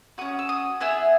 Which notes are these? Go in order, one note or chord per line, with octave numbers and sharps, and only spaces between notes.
C#4 F#4 D#6
E6
D#6
B3 E4 G#4 E6